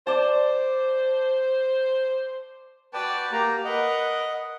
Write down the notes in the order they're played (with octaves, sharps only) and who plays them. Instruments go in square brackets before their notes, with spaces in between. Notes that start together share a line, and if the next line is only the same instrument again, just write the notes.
[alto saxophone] C5 [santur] D5 A5
[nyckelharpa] F#4 D5 [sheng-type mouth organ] B4 G5 A5
[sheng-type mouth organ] A#3 G4 A#5
[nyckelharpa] A#4 B4 [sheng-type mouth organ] D#5 F#5